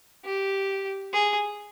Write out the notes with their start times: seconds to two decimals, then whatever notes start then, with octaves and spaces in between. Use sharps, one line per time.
0.25 G4
1.13 G#4